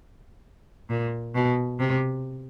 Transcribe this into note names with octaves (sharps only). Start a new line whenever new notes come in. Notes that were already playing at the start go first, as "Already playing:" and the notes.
A#2
B2
C3